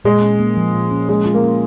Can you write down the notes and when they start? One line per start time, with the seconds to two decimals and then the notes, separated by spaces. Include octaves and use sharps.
0.05 A#2 G#3
0.21 C#4
0.40 A#3
0.57 F3
0.74 A#2
0.91 C#4
1.08 F3 G#3
1.26 F4
1.34 A#3
1.43 C#4